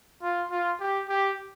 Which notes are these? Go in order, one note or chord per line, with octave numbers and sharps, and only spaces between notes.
F4
F4
G4
G4